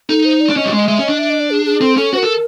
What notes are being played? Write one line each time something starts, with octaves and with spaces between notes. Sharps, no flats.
D#4 A4
C5
D5
D4
C#4 D#5
G3
G#3 D#5
G#3 E5
C#4
D#5
D4
E5
D#5
D5
G#4
G#4
C4 A4
C#4 A4
F#4 C5
A#4
A4